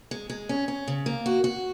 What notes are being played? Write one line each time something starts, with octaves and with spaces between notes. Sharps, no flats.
G#3
G#3
C#4
C#4
C#3
A#3
F#4
F#4